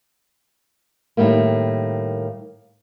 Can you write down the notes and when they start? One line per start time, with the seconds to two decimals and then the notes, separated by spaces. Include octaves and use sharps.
1.17 A2 D#3 G3 A3 A#3